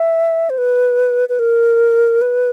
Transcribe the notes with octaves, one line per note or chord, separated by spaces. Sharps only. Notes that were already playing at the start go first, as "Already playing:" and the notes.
Already playing: E5
C5
B4
B4
A#4
B4